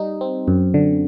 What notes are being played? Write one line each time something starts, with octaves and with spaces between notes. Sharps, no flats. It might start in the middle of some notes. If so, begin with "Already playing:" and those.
Already playing: G3 D#4
C4
F#2
D3